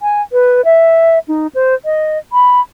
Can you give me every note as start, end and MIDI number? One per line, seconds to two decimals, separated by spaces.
0.01 0.22 80
0.33 0.61 71
0.65 1.19 76
1.28 1.47 63
1.55 1.75 72
1.85 2.18 75
2.33 2.61 83